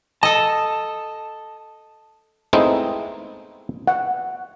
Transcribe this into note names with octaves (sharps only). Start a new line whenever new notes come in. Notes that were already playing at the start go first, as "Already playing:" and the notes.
A4 D#5 A5
G#3 A3 B3 C4 D#4 E4
F#5